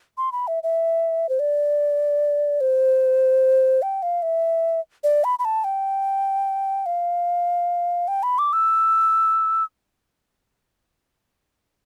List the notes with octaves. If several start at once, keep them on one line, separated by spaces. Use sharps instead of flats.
C6
B5
E5
E5
C5
D5
C5
G5
F5
E5
D5
B5
B5
A5
G5
F5
G5
B5
D6
E6